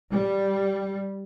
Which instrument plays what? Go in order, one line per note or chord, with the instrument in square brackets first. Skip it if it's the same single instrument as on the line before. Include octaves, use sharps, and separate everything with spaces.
[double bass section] G3